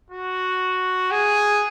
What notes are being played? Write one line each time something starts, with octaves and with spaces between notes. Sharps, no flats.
F#4
G#4